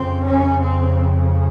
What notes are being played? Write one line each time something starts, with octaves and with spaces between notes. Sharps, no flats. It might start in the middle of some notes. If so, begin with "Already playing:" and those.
Already playing: F2 C#3 C4
C#4
C4